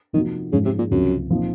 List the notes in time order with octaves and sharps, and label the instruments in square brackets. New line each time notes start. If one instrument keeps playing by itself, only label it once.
[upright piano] C3 F3 A#3 D#4 F#4 [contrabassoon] D#3
[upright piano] G#2 F3 G#3 C#4 [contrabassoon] C#3
[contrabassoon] C3
A#2
[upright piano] C#2 C3 F3 [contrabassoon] F#2
[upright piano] A#2 F3 C4 D#4